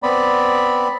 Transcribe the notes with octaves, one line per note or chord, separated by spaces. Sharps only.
B3 C4 D5 B5